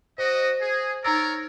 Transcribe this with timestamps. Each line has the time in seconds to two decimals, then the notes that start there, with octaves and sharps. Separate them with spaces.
0.18 F#4 C5 D#5
0.61 G#4
1.05 D#4 A#4 C#5 D5 A#5 E6